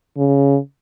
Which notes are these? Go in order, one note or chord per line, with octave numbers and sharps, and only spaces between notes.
C#3